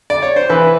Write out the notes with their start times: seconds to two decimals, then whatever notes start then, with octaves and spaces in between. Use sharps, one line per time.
0.10 D5
0.22 C#5
0.36 C5
0.50 E3 B4